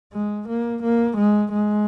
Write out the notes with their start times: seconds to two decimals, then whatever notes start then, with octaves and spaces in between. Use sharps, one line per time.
0.13 G#3
0.49 A#3
0.83 A#3
1.18 G#3
1.52 G#3